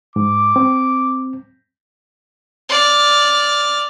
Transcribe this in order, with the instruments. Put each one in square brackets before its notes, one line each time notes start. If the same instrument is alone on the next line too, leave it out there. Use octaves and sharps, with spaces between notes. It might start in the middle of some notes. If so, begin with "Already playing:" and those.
[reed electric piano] G#2 [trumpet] D6
[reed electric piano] C4
[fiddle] D5 F6